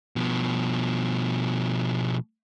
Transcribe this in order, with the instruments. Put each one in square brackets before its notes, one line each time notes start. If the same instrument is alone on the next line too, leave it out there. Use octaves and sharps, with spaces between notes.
[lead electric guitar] B2 F3